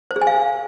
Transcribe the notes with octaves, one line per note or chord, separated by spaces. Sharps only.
C5
G#4
G#5
F5